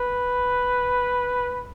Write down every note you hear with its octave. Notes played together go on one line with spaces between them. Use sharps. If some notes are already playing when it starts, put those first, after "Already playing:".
Already playing: B4